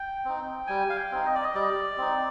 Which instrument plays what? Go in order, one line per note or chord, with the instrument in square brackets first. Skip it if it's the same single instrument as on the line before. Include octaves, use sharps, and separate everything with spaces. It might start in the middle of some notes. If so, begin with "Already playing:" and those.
Already playing: [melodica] G5
C4 D#4
G3 G#5
F5
G5
C4 D#4
D#5
D5
D#5
G3 D5
C4 D#4